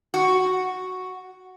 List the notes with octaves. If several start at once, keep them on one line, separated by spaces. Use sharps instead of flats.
F#4